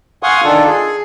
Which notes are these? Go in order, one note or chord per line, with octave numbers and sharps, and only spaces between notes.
F5 F#5 G#5 C6 C#6 D#6
D#3 D4 F4 A4
G#4